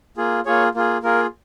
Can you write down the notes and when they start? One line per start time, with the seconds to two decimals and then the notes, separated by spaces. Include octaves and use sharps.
0.17 A#3 F4 G#4
0.46 A#3 F4 G#4 C#5
0.75 A#3 F4 G#4
1.03 A#3 F4 G#4 A#4